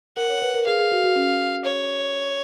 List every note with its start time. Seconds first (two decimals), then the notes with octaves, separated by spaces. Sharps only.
0.17 A#4 F#5
0.29 C#5
0.42 B4
0.54 A#4
0.66 G#4 F5
0.79 G#4
0.92 F#4
1.04 F#4
1.16 C#4
1.65 C#5